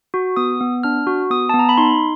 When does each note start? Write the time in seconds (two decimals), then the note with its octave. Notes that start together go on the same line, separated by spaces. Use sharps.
0.14 F#4
0.37 B3 D#6
0.61 B3
0.83 D4 F6
1.07 F#4
1.30 B3 D#6
1.49 B3 A5
1.59 A#5
1.69 B5
1.78 D#4 C6